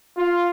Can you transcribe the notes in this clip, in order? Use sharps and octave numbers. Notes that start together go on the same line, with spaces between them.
F4